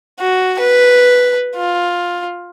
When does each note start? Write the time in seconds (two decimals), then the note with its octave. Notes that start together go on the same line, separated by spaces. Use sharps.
0.19 F#4
0.59 B4
1.56 F4